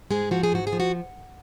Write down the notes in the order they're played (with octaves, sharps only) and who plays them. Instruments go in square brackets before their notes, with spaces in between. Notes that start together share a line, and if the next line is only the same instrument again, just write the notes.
[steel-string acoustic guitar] G#2 G#3 G#4
F3 F#4
G#4
G#2 F#4
G#4
F3
F#4